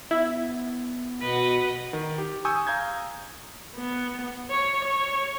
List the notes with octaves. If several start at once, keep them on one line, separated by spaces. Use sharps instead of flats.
B3 E4
B2 B4 D#5 F#5
D#3
G4
G#5 C#6 D#6 E6 G6 D#7
F5 A#5 G6 G#6
B3
C#5
C#5